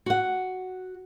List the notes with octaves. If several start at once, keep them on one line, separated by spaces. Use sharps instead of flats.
F#4 F#5